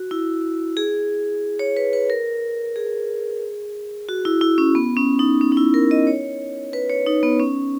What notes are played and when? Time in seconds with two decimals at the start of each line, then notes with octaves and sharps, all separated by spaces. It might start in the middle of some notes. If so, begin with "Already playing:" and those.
Already playing: F#4
0.11 E4
0.77 G#4
1.59 C#5
1.77 B4
1.93 B4
2.10 A#4
2.76 G#4
4.08 F#4
4.25 E4
4.41 E4
4.58 C#4
4.75 B3
4.96 C#4
5.19 D#4
5.41 C#4
5.52 D#4
5.57 E4
5.74 A#4
5.91 D#5
6.07 C#5
6.73 B4
6.89 C#5
7.07 D#4
7.23 B3
7.40 C#4